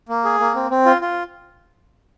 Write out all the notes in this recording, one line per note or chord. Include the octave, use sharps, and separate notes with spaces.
A#3
G#4
A#3
C4
C4
F4
F4